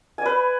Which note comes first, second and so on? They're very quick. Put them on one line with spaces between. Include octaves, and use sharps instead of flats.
G#5 D5 B4